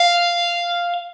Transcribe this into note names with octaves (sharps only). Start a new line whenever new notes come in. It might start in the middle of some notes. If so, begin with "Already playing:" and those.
Already playing: F5